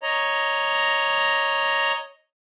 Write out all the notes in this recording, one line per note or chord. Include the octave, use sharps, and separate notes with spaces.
C#5 D#5 A#5